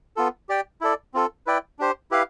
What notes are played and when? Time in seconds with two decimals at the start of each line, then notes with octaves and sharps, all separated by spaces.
0.16 B3 F4 A4
0.49 G4 D5 G5
0.81 E4 A4 D5
1.14 C4 F4 A4
1.46 E4 B4 D5 G5
1.79 D4 G4 C5
2.11 E4 G4 B4 F5